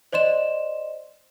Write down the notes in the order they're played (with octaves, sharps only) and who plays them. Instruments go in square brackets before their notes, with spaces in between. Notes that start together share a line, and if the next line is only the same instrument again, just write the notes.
[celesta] C5 D5 D#5 C6 E7